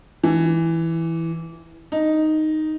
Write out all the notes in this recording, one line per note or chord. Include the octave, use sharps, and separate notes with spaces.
E3
D#4